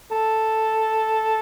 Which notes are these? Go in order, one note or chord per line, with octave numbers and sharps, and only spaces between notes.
A4